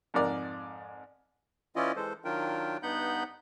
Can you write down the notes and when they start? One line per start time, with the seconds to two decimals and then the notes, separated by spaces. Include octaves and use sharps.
0.14 F2 G#2 A#4 D5
1.76 E3 C#4 E4 F4 D5 D#5
1.96 E3 G#3 A4 C5
2.25 D#3 F#3 D4 F4 A#4 G5
2.83 G2 B3 D#4 F#5 B5 G6